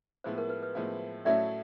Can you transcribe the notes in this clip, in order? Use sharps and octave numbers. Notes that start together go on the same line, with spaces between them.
A2 F3 G#3 B3 E4 C5
A#4
B4
B4
A2 F3 G#3 B3 E4
A2 F#3 A3 C#4 E4 D5 E5